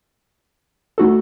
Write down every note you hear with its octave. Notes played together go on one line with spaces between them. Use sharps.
A3 D#4 F#4 A4